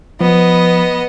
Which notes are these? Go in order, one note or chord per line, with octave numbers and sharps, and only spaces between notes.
F3 B3 D#5